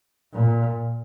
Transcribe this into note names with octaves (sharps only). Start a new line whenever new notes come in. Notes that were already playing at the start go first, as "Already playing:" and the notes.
A#2